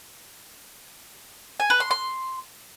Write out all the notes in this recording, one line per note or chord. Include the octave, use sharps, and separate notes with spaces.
G#5
B4
C6
C6